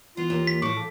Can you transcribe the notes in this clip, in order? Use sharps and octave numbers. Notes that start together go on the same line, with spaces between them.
E3 B3 F4
D#2 A#3
B6
A2 F3 C#6 D6
A4